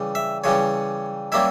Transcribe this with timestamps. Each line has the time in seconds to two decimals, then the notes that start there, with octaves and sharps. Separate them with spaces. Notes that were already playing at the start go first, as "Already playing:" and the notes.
Already playing: C#3 E3 G3
0.15 E5
0.44 C#3 E3 G3 C#5
1.32 G3 A#3 C#4 E4 E5